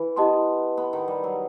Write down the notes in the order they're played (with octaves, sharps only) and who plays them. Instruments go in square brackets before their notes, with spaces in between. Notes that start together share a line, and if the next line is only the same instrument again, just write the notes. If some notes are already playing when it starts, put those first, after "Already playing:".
Already playing: [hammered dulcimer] E3
[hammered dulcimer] B3 [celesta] E4 G4 D#5 A5 C6
[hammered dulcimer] B3
D#3
G3
F#3